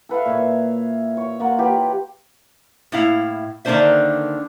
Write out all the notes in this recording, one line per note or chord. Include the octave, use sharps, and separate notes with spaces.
A4 B4 E5 F5
A#2 C#5
C#5
A#3 F4 A#4 F#5
F4 G4 B4
A2 A#3 E4 F5
D3 D#3 A#3 D4 C5 E5